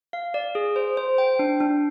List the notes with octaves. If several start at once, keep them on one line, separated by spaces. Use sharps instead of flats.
F5
D5
G#4
C5
C5
G5
D4
D4